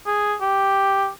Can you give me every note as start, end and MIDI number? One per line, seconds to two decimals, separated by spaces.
0.06 0.35 68
0.41 1.09 67